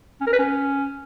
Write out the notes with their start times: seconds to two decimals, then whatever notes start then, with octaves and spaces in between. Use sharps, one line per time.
0.21 C#4
0.27 A#4
0.33 B4
0.39 C#4